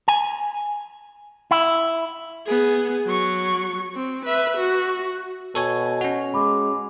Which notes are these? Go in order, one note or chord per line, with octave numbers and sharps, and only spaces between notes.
G#5
E4
B3 G#4
F#3 C#6
C4
B4 E5
F#4
B2 A4 C#5 G#5
C#4 F#4
G#3 B5 D6